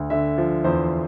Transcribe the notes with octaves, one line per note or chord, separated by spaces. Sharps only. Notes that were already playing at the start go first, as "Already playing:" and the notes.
Already playing: D2
D3 E5
F3
E2 C5